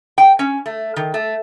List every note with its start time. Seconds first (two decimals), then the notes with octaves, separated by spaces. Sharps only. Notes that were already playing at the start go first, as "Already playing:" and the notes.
0.18 G5
0.39 C#4
0.66 A3
0.96 D#3
1.14 A3